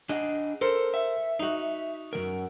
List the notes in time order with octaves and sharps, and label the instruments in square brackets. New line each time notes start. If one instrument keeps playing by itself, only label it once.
[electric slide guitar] D4 G#4 D#5
[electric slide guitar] A4 [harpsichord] A#4 C5
[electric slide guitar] E5
[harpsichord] D#4 F#4
[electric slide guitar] F#2 E3 A#4